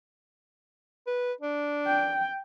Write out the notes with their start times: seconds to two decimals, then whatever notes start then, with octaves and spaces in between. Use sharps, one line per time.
1.07 B4
1.41 D4
1.86 G5